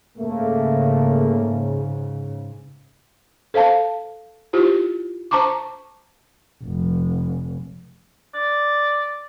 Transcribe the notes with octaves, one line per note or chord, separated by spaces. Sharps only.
G#2 C#3 A3 A#3
A4 C5 F5 A5
E4 F4 G4 C5
C5 A5 A#5 C#6 D6
F1
D5